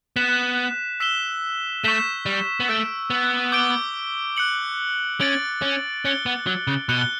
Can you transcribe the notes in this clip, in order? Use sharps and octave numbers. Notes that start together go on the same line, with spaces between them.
B3 F#6 B6 E7
E6 B6 E7 G7
A3 C#6 G6 B6 E7
G3
B3
A3 E6 B6 D7
B3
D6 G6 D7 G7
F#6 C#7 F#7
C#4 A6 D7 F#7
C#4
C#4 F#6 C#7 G7
B3
F#3
C#3
B2 F#6 C#7 G7